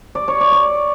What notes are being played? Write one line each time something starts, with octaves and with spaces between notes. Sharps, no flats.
D5
C#5
D5
D5